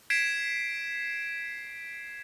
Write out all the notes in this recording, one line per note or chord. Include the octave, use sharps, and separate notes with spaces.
G#6 B6 C7 D7 E7